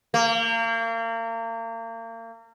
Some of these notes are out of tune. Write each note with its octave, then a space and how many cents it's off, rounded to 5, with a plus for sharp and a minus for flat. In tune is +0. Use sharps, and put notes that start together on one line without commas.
A#3 -35